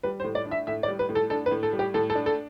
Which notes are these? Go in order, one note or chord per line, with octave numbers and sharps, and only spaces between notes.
G3 B4
C5
A2
D5
D4
E5
A2 E5
D5
G3
B4
A2
A4
D4 A4
B4
A2
A4
G3
G4
A2 A4
A4
D4
A4